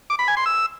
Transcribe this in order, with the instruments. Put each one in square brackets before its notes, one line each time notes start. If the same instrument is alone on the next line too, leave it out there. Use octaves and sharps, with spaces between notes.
[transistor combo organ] D6
B5
G#5
C6
E6